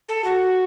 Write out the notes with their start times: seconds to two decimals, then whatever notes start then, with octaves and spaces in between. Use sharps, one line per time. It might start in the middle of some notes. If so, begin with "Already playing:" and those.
0.09 A4
0.24 F#4